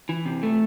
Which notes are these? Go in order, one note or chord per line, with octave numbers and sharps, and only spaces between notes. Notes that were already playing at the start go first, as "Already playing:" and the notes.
E3
C3
A3